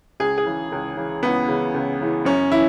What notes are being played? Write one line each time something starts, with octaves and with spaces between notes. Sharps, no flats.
C#2 G#4
G#4
C#3 E3
C#2
C#3 E3
C#2 B3
C#3 E3
C#2
C#3 E3
F#2 C#4
E3 E4